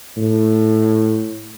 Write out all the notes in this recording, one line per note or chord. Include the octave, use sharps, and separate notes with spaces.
A2